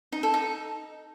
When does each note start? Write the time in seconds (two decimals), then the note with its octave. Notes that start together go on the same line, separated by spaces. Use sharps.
0.12 D#4
0.23 A4
0.34 D#4